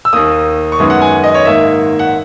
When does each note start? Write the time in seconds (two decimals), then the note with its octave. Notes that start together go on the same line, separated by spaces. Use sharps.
0.05 E6
0.13 D#2 D#3 A#3 D#6
0.72 C#6
0.79 F#2 D#3 G#3 B3 D#6
0.90 F#5
1.02 G#5
1.24 D#5
1.34 C#5
1.45 G#2 D#3 A#3 E5
1.99 F#5